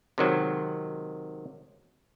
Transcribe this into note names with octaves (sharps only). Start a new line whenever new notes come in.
C3 D#3 F#3 G#3